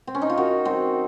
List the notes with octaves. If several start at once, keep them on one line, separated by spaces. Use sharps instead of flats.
C4
C#4
D#4
F4
D#3 F#4
F#3 C4